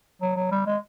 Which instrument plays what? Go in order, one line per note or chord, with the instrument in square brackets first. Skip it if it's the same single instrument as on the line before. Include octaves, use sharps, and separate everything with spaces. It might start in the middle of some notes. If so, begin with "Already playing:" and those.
[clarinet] F#3
F#3
G3
G#3